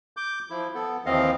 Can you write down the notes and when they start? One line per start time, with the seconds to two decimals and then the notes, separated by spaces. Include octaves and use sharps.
0.17 D6 G6
0.50 F3 E4
0.74 B3 A4
1.06 D#2 E3 F3 C4 D#5 F5